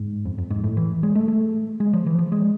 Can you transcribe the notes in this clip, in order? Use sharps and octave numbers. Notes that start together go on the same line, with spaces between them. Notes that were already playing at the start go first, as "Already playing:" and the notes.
Already playing: G#2
F2
F2
G#2
A2
E3
G#3
A3
A3
G#3
F3
E3
F3
G#3